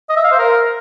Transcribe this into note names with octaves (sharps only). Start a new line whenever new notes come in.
D#5
E5
F5
C5
A#4